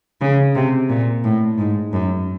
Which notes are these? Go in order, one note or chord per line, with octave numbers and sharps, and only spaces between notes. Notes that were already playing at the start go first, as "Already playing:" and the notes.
C#3
C3
A#2
A2
G#2
F#2